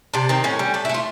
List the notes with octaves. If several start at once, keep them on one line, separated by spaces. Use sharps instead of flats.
C3 D4
D#3 C4
A2 C#4
G3
A3 D4
E4
A3 F4